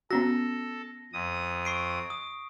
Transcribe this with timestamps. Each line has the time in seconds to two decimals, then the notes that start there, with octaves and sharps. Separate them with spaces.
0.11 B3 C#4 F#4 A4 A#6
1.13 F2 D#6
1.65 C#6 C7 D7
2.10 D#6